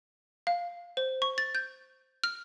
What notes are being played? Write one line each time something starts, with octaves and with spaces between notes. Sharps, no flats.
F5
C5
C#6
A6
G6
F6